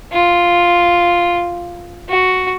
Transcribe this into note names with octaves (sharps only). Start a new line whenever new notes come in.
F4
F#4